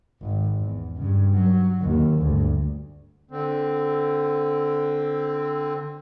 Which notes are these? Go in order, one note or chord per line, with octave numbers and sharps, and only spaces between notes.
G#1
E2
G2 C#3
F#3
D#2
D2 G2
D3 C4